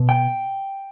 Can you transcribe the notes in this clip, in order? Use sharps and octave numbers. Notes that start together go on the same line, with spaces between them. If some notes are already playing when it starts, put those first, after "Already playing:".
Already playing: B2
G5